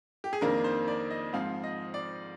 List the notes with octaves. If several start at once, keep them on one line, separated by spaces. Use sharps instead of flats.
G4
G#4
F2 D#3 A#3 D4 A#4
C5
D5
D#5
G#2 F3 C4 F5
D#5
D5